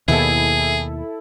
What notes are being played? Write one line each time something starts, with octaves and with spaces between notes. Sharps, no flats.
D#2 B2 E4 G#4 A4